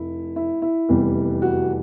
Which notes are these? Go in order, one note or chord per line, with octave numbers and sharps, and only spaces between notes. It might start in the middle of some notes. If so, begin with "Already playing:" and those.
Already playing: F1 E4
E4
E4
F1 E2 C3 E3 G3
F#4